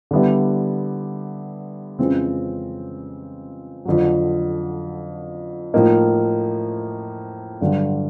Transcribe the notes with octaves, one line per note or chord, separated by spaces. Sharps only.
D3 G3 B3 E4
F2 C#3 E3 G#3 C4
F2 D3 F#3
A2 F3 A#3 D#4
G2 D3 F#3